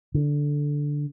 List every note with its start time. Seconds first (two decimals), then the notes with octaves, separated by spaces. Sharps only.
0.14 D3